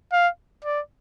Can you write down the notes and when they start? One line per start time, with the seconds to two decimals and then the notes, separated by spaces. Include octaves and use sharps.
0.12 F5
0.65 D5